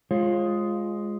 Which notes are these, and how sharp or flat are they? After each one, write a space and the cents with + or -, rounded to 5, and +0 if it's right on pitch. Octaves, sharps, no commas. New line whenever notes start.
G#3 +0 F4 +0 C#5 -45